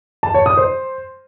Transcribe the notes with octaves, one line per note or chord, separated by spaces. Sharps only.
A5
C#5
D#6
C5